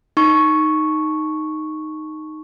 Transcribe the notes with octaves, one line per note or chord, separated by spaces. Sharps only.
D#4 C#6